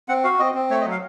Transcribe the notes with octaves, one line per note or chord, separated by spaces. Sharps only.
C4 F#5
F#4 F5
C4 D#5
C4
A3 C#5
D#5
F#3
F5